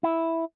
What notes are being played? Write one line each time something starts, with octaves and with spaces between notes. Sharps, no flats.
E4